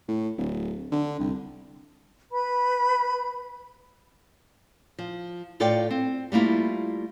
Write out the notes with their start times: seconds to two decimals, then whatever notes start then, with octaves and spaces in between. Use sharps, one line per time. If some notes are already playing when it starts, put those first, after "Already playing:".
0.09 A2
0.38 D1
0.92 D3
1.20 C2
2.31 B4 B5
4.99 F3
5.60 A2 F4 A4 D5 F5 G5
5.90 C4
6.32 G3 A3 A#3 E4 F4